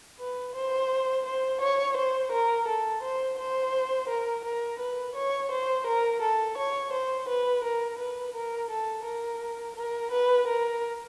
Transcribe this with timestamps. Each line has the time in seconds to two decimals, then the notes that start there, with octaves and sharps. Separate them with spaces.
0.19 B4
0.55 C5
1.26 C5
1.61 C#5
1.97 C5
2.32 A#4
2.68 A4
3.03 C5
3.39 C5
4.09 A#4
4.45 A#4
4.80 B4
5.16 C#5
5.52 C5
5.87 A#4
6.22 A4
6.58 C#5
6.93 C5
7.29 B4
7.64 A#4
7.99 B4
8.35 A#4
8.71 A4
9.05 A#4
9.76 A#4
10.12 B4
10.48 A#4